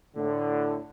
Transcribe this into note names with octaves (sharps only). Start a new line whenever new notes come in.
A2 D3